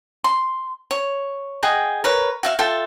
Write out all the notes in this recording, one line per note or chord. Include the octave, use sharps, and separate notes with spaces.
C6
C#5
G#4 D#5 F#5 G5
A#4 B4 C#5
F#4 E5 F5
F4 A4 E5 G5